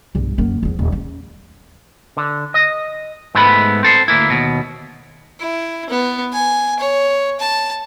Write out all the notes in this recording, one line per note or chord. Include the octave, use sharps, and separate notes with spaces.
B1 G2
F#2 A#3
E2 F3
D#1
C#4
D3
D#5
G#2 G#3 A3 B3 B5
C4 A4 C5
D2 A#3 E4
D#2 B2
E4
B3
G#5
C#5
A5